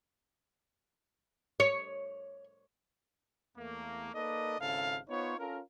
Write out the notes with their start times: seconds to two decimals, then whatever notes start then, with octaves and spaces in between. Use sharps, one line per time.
1.60 C#5
3.57 E2 A3 A#3
4.14 A#3 D#4 A4 B4 D5 D#5
4.60 G#1 G#2 C#3 E4 A4 F5
5.09 B3 D#4 F4 C5 C#5
5.38 C#4 F4 A4 A#4